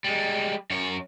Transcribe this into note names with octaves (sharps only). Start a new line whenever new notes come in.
G3 G#3
F#2 C#5